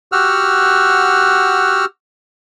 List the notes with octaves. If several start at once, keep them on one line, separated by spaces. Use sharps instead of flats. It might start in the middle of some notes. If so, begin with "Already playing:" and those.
F#4 G4 F#5 E6 F6